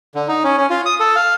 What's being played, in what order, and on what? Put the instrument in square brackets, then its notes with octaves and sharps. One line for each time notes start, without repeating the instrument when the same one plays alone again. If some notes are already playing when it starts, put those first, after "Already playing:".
[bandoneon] D3
D#4
C#4
C#4
F4
D#6
A4
F5